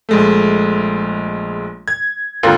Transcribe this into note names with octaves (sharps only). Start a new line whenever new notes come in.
A#1 G#3 A3
G#6
G#1 D#2 D3 F4 A#4